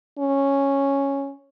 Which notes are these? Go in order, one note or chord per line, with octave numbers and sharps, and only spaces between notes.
C#4